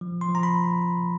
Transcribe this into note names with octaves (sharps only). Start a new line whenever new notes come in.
F3
C6
F3
A#5
B5